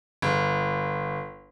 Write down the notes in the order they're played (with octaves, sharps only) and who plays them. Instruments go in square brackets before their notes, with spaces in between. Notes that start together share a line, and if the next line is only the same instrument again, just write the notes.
[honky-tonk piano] G1